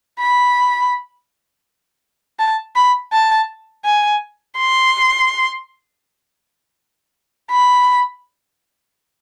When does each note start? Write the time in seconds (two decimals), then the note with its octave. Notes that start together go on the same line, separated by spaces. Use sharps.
0.20 B5
2.39 A5
2.75 B5
3.13 A5
3.85 G#5
4.59 C6
7.51 B5